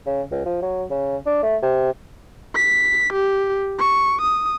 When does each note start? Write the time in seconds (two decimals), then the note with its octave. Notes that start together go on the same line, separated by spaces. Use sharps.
0.06 C#3
0.31 C#2
0.46 F3
0.62 F#3
0.90 C#3
1.26 D4
1.43 A3
1.62 C3
2.55 B6
3.13 G4
3.79 C#6
4.21 D#6